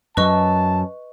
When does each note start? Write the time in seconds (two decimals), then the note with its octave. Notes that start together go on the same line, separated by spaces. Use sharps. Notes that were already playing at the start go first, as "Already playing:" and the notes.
0.17 F#2 F#3 B4 D#5 A5 C#6